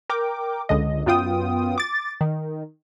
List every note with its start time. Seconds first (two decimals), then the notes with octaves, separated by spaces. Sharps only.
0.09 A#4 G5 D6
0.69 C#2 D3 D#5
1.06 F#2 B3 F4 G5 D#6
1.78 D6 A6
2.21 D#3